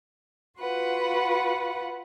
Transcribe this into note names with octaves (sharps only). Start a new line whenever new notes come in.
F4 F#4 B4 F#5